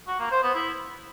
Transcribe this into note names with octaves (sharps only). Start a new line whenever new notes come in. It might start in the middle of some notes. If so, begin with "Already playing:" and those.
F#4
A#3
C5
B3
E4